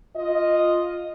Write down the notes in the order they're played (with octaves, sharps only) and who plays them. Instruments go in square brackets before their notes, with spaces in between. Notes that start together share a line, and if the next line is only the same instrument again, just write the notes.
[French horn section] F4 D#5